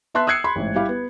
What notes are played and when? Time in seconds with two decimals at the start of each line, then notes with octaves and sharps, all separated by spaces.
0.14 B3 E5 A5 C6 F#6
0.27 D#6 E6 F#6 G#6 C7 C#7
0.44 B5 C6
0.56 A1 G#2
0.75 G3 E4 G4 F5
0.89 B3